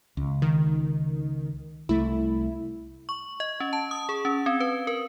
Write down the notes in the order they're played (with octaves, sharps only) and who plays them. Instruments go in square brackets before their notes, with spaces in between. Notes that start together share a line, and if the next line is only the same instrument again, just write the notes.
[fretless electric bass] C#2
[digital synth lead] D#3
[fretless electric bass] C2 A3 [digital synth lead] E4
[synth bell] C#6
D#5
C#4
A5
D#6
G#4
C#4
C4
B4
A#4